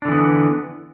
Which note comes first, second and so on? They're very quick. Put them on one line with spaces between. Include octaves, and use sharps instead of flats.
D4 D3 E3 B3